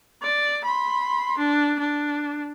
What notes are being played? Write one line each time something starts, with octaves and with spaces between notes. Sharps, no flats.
D5
B5 C6
D4
D4